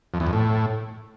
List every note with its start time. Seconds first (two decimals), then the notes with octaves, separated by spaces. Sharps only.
0.14 F2
0.20 E2
0.27 F2
0.33 A2